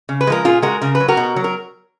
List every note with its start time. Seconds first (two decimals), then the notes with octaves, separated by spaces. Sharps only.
0.09 C#3
0.21 B4
0.27 F3 G#3 A#4
0.45 A#2 F4 G#4
0.62 G#3 F#4 A#4
0.81 C#3 A#4
0.95 B4
1.00 F#3
1.08 F#4 A#4
1.17 B2
1.36 F#3
1.44 A#4